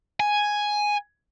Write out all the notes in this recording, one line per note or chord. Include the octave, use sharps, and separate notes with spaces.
G#5